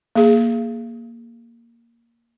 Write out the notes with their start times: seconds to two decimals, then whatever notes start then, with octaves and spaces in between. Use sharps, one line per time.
0.16 A#3 G#4